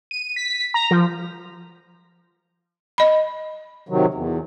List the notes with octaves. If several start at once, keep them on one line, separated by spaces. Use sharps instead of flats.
D#7
B6
A#5
F3
D#5 B5
C3 D#3 F#3
E2